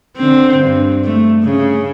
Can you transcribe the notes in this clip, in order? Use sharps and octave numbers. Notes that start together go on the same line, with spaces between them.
D3 C4
G2
A3
C#3